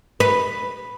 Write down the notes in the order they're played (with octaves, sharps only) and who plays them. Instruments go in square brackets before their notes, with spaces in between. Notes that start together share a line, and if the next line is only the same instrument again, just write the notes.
[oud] B4